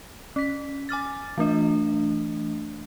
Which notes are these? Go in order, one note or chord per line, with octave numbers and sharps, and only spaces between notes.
C#4 B6
G#5 D6 F6 A6
E3 A3 D4 D#5